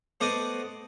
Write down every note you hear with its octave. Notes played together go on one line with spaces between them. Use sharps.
A3 B3 C5 D5 D#5